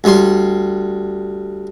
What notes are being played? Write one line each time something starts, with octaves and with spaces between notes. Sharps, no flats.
D2 G3 C6